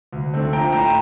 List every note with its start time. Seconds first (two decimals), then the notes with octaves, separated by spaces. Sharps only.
0.13 D2
0.34 D3 A3 C4
0.53 A#1 G5 A#5
0.72 A2 A3 G5 A#5